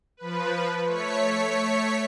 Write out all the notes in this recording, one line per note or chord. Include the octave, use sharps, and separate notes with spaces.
F3 B4
A3 C#5 B6 C#7